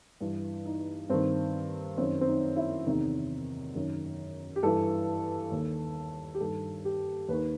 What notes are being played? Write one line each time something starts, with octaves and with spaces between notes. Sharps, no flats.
G2 E3
D#4
G2 D#3 C4
F#2 D#3 C4
C4
D#4
E4
E2 C3 D#3 D#4
F#2 D#3
G4
G2 E3 A4
D#2 D#3
G4
G2 D#3 A4
G4
D#2 D#3 B4